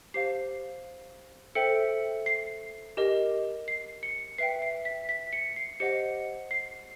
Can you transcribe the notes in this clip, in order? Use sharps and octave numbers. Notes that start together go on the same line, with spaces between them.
G4 C5 F5 C7
A4 C5 E5 G5 C#7
C7
G4 A#4 D#5
C7
C#7
B4 E5 G5 C7
C7
B6
B6
C#7
C7
G4 C5 D#5 F#5 C#7
C7